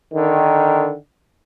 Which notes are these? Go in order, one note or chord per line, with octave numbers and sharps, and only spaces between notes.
D3 D#3